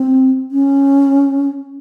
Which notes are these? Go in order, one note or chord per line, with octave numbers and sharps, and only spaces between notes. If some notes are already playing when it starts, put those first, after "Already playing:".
Already playing: C4
C#4